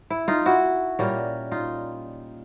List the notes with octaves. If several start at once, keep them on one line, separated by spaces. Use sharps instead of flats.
E4
D#4 F4
E4 F#4
A#2 G3 A#3 C#4
D#4 F4